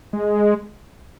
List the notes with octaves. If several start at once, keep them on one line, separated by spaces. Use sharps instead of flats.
G#3